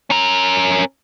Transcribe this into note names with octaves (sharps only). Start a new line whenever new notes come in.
C#4 A#4